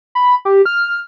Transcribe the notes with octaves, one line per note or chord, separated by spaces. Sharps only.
B5
G4
F6